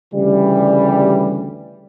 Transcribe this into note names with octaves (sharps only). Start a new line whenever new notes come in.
D2 C#3 E3 G3